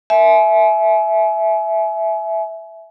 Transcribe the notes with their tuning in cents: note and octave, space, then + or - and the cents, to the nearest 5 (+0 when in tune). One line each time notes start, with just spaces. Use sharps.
E5 +0 G#5 +35